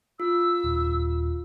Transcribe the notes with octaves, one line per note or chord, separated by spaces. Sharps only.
F4 E6
D#1